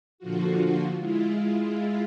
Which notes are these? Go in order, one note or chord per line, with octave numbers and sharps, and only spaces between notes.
A#2 D3 F3 F4 F#4
G#3 E4 F4